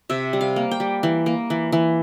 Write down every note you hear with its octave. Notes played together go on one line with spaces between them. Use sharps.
C3 E5
G3
F5
A#3
G5
G3
E3
A#3
E3
E3